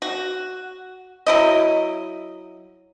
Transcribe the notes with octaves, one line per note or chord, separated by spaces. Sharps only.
F#4
F#3 E4 D#5